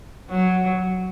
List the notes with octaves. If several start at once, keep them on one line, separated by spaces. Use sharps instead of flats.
F#3